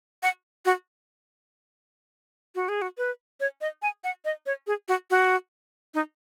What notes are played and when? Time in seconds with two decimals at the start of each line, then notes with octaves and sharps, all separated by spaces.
0.23 F#5
0.65 F#4
2.55 F#4
2.69 G#4
2.82 F#4
2.98 B4
3.40 C#5
3.61 D#5
3.82 G#5
4.04 F#5
4.25 D#5
4.46 C#5
4.67 G#4
4.88 F#4
5.10 F#4
5.94 D#4